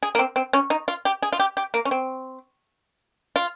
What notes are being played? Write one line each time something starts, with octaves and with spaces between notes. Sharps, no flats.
G#4
A#3
C4
C4
C#4
D#4
F4
G4
G#4
F4
G4
G4
A#3
C#4
C4
F4